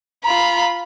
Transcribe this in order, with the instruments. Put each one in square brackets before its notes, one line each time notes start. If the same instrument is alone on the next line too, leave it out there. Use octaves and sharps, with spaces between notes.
[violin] F4 B5 [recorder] A#5